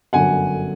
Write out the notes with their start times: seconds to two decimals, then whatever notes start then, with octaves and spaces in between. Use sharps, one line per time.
0.13 G1 F#2 D3 F#3 F#5 G#5